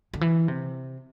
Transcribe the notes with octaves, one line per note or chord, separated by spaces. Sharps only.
D3
E3
C3